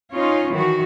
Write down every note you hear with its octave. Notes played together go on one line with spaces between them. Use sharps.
C#4 D#4 F4 C#5
D#3 E3 F#4